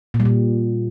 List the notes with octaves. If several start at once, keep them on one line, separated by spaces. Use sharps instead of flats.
A#2
G3
A#2